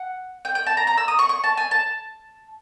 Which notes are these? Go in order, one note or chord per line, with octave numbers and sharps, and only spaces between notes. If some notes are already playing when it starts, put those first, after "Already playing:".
Already playing: F#5
G5
G5
A5
A#5
A#5
E6
D#6
C#6
C#6
A5
G#5
A5